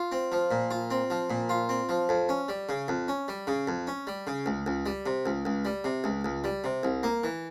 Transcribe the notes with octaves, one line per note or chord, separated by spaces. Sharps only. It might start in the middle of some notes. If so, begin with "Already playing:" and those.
Already playing: F4
C4
F3
A#2
F4
C4
F3
A#2
F4
C4
F3
F2
C#4
G3
C#3
F2
C#4
G3
C#3
F2
C#4
G3
C#3
C#2
C#2
G3
C3
C#2
C#2
G3
C3
C#2
C#2
G3
C3
C2
A#3
E3